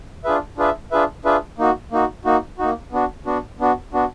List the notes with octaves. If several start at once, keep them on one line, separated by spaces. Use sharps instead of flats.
D4 F4 G#4 B4 E5
D4 F4 G#4 B4 E5
D4 F4 G#4 B4 E5
D4 F4 G#4 B4 E5
A#3 D#4 F#4
A#3 D#4 F#4
A#3 D#4 F#4
A#3 D#4 F#4
B3 D4 F#4
B3 D4 F#4
B3 D4 F#4
B3 D4 F#4